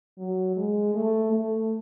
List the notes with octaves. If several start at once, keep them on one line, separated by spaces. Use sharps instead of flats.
F#3
G#3
A3
A3